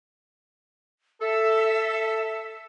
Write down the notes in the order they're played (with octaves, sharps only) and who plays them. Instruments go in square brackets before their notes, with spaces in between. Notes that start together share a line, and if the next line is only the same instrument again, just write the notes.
[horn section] A4 [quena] E5